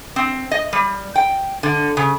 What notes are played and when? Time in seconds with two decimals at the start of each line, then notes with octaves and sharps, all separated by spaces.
0.16 C4
0.51 D#5
0.73 G3
1.16 G5
1.63 D3
1.97 C#3